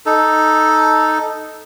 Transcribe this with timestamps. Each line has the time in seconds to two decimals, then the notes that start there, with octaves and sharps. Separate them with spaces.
0.06 D#4 A4